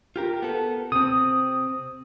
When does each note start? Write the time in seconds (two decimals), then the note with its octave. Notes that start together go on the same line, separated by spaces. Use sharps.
0.16 F4 G4 A#4
0.42 B3 A4
0.92 C3 C4 D#6